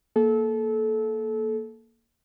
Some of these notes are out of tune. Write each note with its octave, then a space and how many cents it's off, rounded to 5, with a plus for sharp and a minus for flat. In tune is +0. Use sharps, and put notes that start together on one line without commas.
A#3 +0 A4 -25